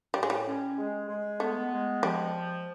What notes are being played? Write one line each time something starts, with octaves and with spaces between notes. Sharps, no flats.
A2 G3
G#3
G3
C#4
G#3
G#3
A3 B3
G#3
F3 G3